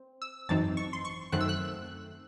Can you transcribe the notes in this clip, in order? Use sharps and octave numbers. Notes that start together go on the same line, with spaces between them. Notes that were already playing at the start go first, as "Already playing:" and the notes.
Already playing: C4
E6
G#1 F#2 E3 C4 D#4 A5
C#6
C6
C#6
F#2 D#3 A3 C4 F#6
E6
F#6